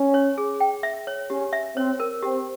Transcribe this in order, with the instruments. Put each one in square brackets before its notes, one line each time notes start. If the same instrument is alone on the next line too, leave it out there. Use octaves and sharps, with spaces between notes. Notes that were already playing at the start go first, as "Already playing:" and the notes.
Already playing: [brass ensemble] C#4
[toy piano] C#5
G#4
G5
E5
C#5
[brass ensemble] C#4 [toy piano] G4
[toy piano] E5
[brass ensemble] C4 [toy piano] C#5
[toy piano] A#4
[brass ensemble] C4 [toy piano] G4